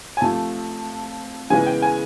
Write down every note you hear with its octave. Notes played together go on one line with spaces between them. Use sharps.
G#5
C3 F3 A3 A5
C#3 E3 G#3 B3 G#5
G5
G#5